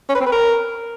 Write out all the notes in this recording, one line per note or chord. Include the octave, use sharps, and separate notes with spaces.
C#4
B4
C4
B4
A#4